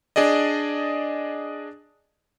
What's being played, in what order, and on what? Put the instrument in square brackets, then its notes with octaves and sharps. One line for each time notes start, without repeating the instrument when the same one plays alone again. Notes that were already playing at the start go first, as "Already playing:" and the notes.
[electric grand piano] D4 G#4 D5 D#5